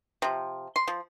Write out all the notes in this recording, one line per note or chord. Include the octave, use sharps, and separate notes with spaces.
C3 F3
C6
F3